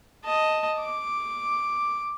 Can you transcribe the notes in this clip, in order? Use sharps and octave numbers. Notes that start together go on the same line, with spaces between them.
D#5 A5
D6